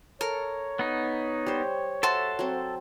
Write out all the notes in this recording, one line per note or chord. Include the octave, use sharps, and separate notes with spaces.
A4 A#4 C#5
B3 D#4
G3 C5
F#4 A4 C5 E5 A5
F#3 C4